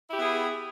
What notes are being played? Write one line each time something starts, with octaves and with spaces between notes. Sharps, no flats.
B3 E4 G4 G#4